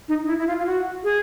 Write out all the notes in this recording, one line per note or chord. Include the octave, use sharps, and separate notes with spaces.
D#4
D#4
E4
E4
F4
F4
F#4
G#4